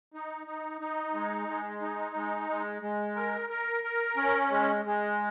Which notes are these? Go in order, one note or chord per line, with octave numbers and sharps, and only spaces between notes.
D#4
D#4
D#4
G#3
G#3
D#4
G#3
G#3
G#3
A#4
A#4
A#4
C#4
G#3
G#3